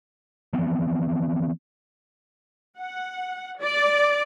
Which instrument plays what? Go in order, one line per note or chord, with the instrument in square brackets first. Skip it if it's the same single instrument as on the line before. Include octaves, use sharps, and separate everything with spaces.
[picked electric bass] E3 F3 B3 C4
[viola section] F#5
D5